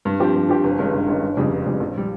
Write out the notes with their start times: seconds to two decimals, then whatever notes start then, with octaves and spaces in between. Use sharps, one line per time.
0.05 G2
0.20 F3 C4 G4
0.35 G2
0.49 F3 C4 G4
0.64 G1
0.79 G2 D#3 G#3 C#4
0.93 G1
1.08 G2 D#3 G#3 C#4
1.23 G1
1.37 F2 C#3 G3
1.51 G1
1.66 F2 C#3 G3
1.80 A#1
1.97 G3